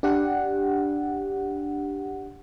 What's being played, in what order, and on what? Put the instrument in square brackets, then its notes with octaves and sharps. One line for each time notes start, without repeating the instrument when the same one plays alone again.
[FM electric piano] D4 G4 F#5